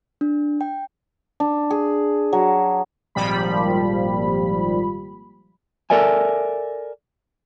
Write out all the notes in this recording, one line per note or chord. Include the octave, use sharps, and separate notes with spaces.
D4
G5
D4
G#4
F#3
G#1 A#2 F3 G3 B5
A4 A#4 D5 E5 G#5